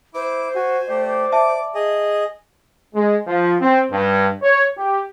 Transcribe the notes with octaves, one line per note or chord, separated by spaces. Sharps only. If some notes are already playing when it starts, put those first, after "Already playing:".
E4 C5 D6
F#4 G#5
A3 G4 D5
E5 A5 D6
G#4 D#5
G#3
F3
C4
G2
C#5
G4